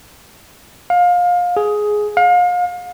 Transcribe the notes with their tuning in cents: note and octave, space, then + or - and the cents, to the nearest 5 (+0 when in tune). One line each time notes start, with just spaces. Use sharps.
F5 +25
G#4 +10
F5 +35